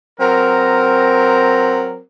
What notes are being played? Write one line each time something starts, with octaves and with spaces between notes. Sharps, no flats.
F#3 C4 A#4